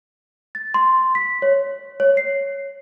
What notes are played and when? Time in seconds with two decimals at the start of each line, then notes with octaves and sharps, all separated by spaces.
0.55 A6
0.74 C6
1.15 B6
1.42 C#5
2.00 C#5
2.17 C7